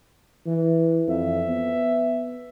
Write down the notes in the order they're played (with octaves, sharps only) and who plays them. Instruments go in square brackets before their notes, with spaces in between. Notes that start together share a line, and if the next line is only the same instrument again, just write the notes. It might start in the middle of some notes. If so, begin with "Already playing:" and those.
[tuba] E3
[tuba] F2 [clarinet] E5
[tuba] B3